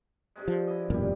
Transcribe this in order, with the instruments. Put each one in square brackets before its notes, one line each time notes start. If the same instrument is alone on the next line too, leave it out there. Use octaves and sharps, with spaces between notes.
[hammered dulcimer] G2 C3 G#3
[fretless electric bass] F3
[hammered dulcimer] E4 D5 D#5
[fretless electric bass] E1 F#2 A#2 [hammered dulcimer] G3 F4